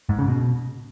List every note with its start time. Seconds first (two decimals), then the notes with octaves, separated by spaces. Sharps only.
0.09 G#2
0.19 C#3
0.28 B2